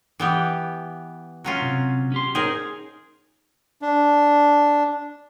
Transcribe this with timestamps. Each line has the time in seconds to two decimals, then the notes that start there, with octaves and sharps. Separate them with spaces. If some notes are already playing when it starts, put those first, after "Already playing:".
0.20 E3 B3 G4
1.44 F#3 C#4 F4
1.62 C3
2.12 C#4 G4 C6
2.35 D#4 G#4 A#4 C5 C#5
3.82 D4